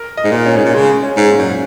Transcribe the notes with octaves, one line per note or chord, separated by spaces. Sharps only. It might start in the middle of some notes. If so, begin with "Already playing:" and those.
Already playing: A#4
D#5
G#2
A#2
C#4
G#2
A#2
C#3 G#3
C#4
G#2
A#2
F#2